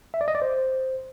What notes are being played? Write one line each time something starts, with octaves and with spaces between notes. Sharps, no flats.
E5
D5
D#5
D5
C5